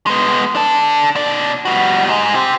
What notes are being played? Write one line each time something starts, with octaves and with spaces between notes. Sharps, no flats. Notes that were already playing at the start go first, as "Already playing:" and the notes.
G#3 B3
D4 A4
B2 D5
G3 F#4
G#2 G#3
G4 C5